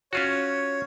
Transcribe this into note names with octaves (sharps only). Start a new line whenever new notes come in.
C#4 F4 F#4 C#5